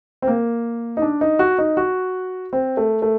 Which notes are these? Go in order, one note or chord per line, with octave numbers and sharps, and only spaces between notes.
C4
A#3
D#4
D4
D#4
F#4
D#4
F#4
C4
A3
A3